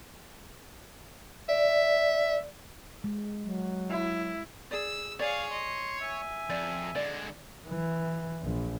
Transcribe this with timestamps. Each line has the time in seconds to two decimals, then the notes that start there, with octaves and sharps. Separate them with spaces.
1.49 D5 E5
3.04 G#3
3.44 F#3
3.90 E4
4.71 G#4 D5 E6
5.20 G#4 C#5 D5 F5
5.50 D#5 C6
6.01 E5 G#5
6.50 F2 D5
6.95 D3 G#3 D5
7.68 E3
8.42 A#1